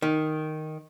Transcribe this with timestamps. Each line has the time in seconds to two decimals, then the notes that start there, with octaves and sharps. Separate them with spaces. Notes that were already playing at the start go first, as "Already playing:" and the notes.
0.02 D#3